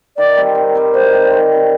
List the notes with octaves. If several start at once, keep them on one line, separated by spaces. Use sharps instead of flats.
D#3 D5
G3 C4
D#3
G3 C4
D#3 C5
G3 C4
D#3
G3 C4